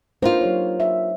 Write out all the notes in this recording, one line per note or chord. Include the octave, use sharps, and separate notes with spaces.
A#3 D4 D#4 F4 B4 C5
F#3 G4 C#5
E5